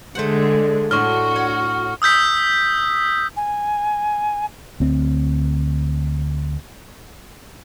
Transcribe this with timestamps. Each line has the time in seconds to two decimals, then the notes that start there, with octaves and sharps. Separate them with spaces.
0.15 D3 G#3 A3 C5 F#5
0.91 A2 D4 F#4 C6 C#6 F6
1.36 C#5
2.02 D#6 E6 G6 B6
3.36 G#5
4.80 D2 C4